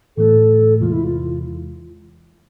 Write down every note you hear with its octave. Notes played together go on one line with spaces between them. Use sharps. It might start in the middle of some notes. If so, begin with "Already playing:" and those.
A2 E3 A3 A4
E2 C3 E3 G#3 F4
E4
F4